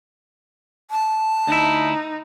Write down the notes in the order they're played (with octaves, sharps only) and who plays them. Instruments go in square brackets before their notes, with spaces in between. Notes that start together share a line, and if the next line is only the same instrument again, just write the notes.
[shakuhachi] A5
[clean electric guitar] D2 E4 [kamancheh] D#4